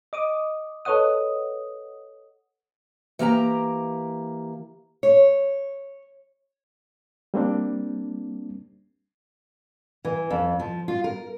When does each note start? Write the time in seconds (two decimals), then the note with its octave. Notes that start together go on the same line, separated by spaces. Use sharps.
0.13 D#5 D6 D#6
0.85 A4 B4 C#5 D#5 F#5 D#6
3.19 E3 A#3 G4 A#5
5.03 C#5
7.34 G3 A#3 C4 D4
10.05 E3
10.30 F2
10.60 F3
10.88 F4
11.04 A#4